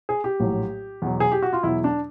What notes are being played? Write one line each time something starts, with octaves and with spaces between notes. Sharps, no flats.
G#4
G4
A#1 A2 F#3
E2 B2 F#3
G#4
G4
F#4
F4
E2 B2 F#3 E4
D4